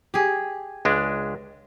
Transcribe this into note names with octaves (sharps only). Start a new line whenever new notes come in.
G4 G#4
C#2 G#3 D4